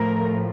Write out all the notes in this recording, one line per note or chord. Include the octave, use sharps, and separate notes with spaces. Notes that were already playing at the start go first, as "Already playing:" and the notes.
Already playing: A2 F3 A3 A#4